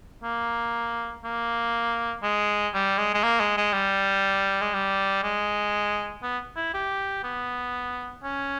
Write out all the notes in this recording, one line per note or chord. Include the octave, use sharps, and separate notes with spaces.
A#3
A#3
G#3
G3
G#3
G#3
A#3
G#3
G#3
G3
G#3
G3
G#3
B3
E4
G4
B3
C#4